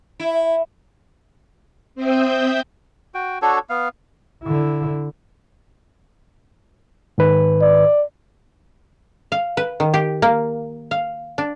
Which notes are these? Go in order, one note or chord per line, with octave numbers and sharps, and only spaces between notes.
E4
C4 C5 E5 G5 D#6 G6
F#4 G5
D4 F#4 A4 C#5
B3 F5
D3 E4
G#2 D#3 B4
D5
F5
B4
D#3
G4
A#3
F5
D4